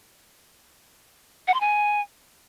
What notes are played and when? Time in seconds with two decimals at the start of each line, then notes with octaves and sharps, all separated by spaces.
1.48 F#5
1.54 C6
1.60 G#5